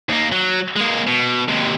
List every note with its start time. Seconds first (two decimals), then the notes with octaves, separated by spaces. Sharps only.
0.09 D#2 A#3
0.32 F#3
0.76 G#3 A#3
1.08 B2
1.49 D#2 C3